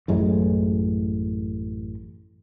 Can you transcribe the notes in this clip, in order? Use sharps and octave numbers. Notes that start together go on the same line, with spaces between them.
A1 F#2 A2 G#3